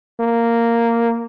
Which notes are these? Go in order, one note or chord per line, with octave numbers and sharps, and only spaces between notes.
A#3